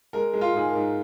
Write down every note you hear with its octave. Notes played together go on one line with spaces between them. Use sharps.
G#3 A#4
G#3
F4
G#2 G#4
A#4
G#2